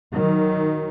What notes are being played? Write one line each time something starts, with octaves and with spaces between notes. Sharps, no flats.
D#3 F#3